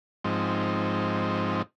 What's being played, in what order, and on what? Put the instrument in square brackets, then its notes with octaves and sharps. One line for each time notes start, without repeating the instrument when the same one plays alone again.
[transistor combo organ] G#2 F3 C4 D#4